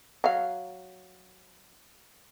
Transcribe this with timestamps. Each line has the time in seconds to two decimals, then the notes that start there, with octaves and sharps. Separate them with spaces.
0.24 F#3 F5